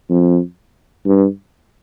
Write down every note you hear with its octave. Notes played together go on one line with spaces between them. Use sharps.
F2
G2